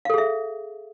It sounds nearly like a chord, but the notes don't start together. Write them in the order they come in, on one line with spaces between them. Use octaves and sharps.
F5 A4 G#4 E5